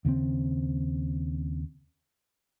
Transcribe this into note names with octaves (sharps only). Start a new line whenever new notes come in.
D#2 C#3 A#3 C4